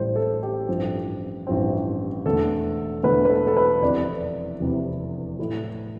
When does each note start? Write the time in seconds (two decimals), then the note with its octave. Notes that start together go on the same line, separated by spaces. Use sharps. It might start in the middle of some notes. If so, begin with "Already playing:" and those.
Already playing: A1 A2 G3 C5
0.16 A4
0.43 G4
0.68 A1 G2 F3 C4
1.47 A1 G2 F3 C4
2.25 E1 E2 D3 A3 A4
3.03 E1 E2 D3 A3 B4
3.25 B4
3.29 A4
3.47 A4
3.57 B4
3.82 F1 E2 C3 E3 D5
4.60 F1 E2 C3 E3
5.39 A2 E3 A3 E4